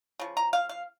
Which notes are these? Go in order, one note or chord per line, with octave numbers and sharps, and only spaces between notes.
C#3 F3
A#5
F5
F5